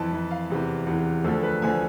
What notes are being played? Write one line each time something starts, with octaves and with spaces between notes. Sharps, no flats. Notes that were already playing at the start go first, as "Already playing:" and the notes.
Already playing: F2 E3 A5 B5
F2 E3
F5
E2 C3 E3
E2 C3 E3
D2 D3 F3 A4
B4
D2 D3 F3 G#5